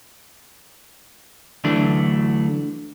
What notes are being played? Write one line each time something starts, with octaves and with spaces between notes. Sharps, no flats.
D2 D3 E3 F#3 A3 D4